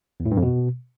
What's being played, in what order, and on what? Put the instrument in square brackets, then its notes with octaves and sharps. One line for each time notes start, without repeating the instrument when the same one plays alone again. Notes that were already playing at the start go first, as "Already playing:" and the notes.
[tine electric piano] E2
A2
G2
F2
B2